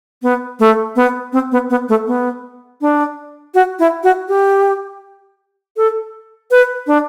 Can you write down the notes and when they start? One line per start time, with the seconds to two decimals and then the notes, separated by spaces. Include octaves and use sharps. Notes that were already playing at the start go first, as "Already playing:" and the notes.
0.22 B3
0.59 A3
0.96 B3
1.33 C4
1.52 B3
1.70 B3
1.89 A3
2.07 B3
2.81 D4
3.54 F#4
3.79 E4
4.03 F#4
4.28 G4
5.77 A4
6.51 B4
6.87 D4